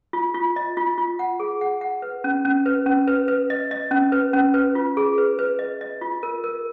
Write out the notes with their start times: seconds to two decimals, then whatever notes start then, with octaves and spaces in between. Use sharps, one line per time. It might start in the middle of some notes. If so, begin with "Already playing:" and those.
0.13 F4
0.35 F4
0.56 D#5
0.77 F4
0.98 F4
1.19 F#5
1.40 G#4
1.61 F#5
1.81 F#5
2.02 B4
2.24 C#4
2.45 C#4
2.66 B4
2.86 C#4
3.08 B4
3.28 B4
3.50 D#5
3.71 D#5
3.91 C#4
4.12 B4
4.33 C#4
4.54 B4
4.75 F4
4.97 G#4
5.18 B4
5.39 B4
5.59 D#5
5.81 D#5
6.01 F4
6.23 A#4
6.44 A#4